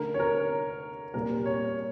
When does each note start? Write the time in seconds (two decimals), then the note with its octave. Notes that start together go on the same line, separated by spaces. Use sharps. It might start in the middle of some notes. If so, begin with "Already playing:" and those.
Already playing: D3 A3 A#4
0.14 C#5
0.20 A#4
1.14 A#2 G3 A#3 A#4
1.46 C#5